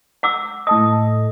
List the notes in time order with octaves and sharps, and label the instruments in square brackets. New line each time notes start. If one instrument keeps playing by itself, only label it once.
[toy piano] F#5 D6 E6
[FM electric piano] A2 A4 D#5 [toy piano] D#6